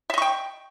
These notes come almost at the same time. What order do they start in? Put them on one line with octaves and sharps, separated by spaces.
E5 D#5 C#6 G5